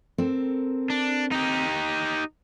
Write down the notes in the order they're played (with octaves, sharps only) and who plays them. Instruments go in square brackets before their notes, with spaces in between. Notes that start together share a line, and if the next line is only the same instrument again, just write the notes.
[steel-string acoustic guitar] C4 A4 A#4
[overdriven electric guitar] D4
D#4 G4